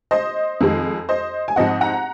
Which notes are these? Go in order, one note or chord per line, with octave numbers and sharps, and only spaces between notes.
C5 D#5
F2 D#3 G#3
C5 D#5
G#5
G#2 F3 C4 D#5 F#5
F#5 A#5